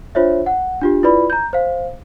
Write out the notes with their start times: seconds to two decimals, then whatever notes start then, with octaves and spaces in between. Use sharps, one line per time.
0.15 D4 F4 C5 C#5 E5
0.46 F#5
0.81 D4 F4 G4
1.03 E4 F4 B4 D5 B5
1.30 A#5 G6
1.53 C5 F5